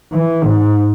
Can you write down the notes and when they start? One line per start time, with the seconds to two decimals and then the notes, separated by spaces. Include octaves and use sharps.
0.12 E3
0.45 G#2